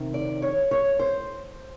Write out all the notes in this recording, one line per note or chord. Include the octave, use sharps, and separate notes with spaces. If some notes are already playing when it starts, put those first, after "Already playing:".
Already playing: C3 D#3
D5
C#5
C#5
C5